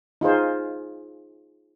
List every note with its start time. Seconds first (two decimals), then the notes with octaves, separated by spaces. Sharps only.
0.21 D#4 F4 G#4 C5